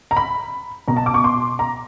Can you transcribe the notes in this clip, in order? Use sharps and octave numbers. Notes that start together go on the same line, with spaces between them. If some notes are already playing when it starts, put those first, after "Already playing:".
A#5
B5
B2 A#5
A5
D6
C#6
C6
A#5